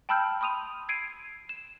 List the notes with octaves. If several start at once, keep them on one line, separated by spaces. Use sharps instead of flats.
G5 A5 B5 E6 F6 G6
B5 C6 D#6 D#7 F7
E6 G#6 C7 D7 D#7
E7